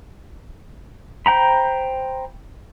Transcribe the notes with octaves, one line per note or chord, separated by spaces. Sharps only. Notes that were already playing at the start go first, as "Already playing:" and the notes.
C5 G5 A#5 B5